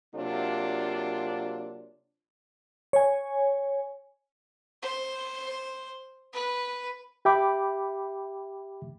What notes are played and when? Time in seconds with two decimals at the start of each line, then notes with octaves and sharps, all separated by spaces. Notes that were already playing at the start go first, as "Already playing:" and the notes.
0.15 C3 F#3 A#3 D4 F4
2.93 C#5 G#5
4.82 C5
6.33 B4
7.25 G4 E5 G5 B5 D6